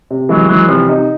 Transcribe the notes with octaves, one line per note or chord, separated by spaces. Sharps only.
C3
E3 F#3 G#3
E3 F#3 G#3
C3 F3 G3
D#4